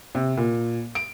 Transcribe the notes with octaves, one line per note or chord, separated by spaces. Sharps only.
C3
A#2
D7